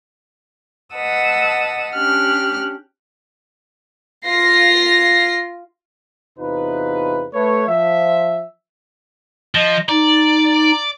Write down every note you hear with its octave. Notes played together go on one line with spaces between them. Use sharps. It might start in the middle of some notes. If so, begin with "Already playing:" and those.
B4 D#5 F#5 A5 D#6 E6
C#4 D4 G4 G5 F6 F#6
F4 A#6 C7
E2 C3 D#4 F4 B4
A3 B4 C#5
F3 E5
F3 D#5
D#4 D5